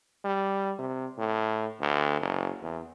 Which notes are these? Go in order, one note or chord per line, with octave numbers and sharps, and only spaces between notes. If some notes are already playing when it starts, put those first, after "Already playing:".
G3
C3
A2
D2
F#1
E2